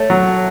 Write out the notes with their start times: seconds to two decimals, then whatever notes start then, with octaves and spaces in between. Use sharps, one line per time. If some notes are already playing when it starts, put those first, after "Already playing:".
Already playing: A3 C#5
0.10 F#3